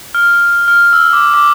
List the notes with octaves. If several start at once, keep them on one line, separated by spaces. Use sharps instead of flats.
F6
F6
F6
E6
D6
D6